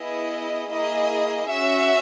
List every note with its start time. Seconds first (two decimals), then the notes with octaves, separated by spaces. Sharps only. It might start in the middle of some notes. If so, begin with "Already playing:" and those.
Already playing: B3 E4 G#4 D#5
0.71 A#3 E4 G#4 D#5
1.50 C#4 F#4 E5